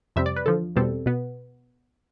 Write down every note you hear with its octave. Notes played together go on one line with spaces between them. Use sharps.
F2 C3 G3 C4 E5
D5
B4
E2 D3 F3 A4
E2 B2 G3 C4 A4
B2 B3